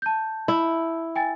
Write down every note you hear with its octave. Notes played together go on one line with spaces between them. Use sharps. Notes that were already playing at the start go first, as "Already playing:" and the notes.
A5 G6
E4
G5 G#5 A6